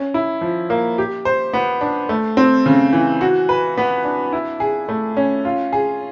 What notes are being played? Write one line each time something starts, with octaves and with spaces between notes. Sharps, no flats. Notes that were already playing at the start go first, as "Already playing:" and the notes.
Already playing: C#4
E4
F3
A#3
G4
C5
B3
D4
A3
C4
C#3
E3
F#4
B4
B3
D4
E4
G#4
A3
C#4
F4
G#4